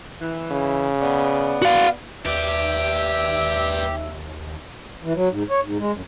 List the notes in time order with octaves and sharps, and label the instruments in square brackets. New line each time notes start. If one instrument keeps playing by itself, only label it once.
[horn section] E3
[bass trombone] C#3
[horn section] B3 D5
[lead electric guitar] F#4 F5
[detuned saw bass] D#2 [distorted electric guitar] G4 [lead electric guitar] B4 D5 [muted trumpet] E5
[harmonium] E3
F#3
G#2
C#5
G#2
G#3
F#2